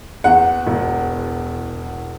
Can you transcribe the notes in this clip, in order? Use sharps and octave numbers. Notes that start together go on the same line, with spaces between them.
E2 F#5
E1